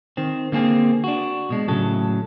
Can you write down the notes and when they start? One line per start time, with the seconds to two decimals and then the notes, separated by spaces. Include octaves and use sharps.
0.17 D#3 C4
0.52 D3 A#3 C4 G#4
1.04 D4 F#4
1.50 B2 G#3
1.68 A2 C#3 F#3 A4